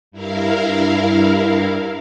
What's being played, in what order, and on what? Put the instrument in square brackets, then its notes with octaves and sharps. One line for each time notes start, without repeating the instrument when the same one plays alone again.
[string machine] G2 E4 A#4 F5